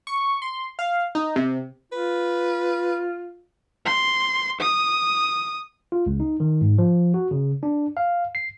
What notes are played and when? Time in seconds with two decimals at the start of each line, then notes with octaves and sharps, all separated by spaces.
0.07 C#6
0.42 C6
0.79 F5
1.15 D#4
1.36 C3
1.92 F4 B4
3.86 C6
4.61 D#6
5.92 F4
6.06 C#2
6.20 D#4
6.40 D#3
6.61 G#2
6.78 F3
7.14 F#4
7.31 C#3
7.63 D4
7.97 F5
8.35 C7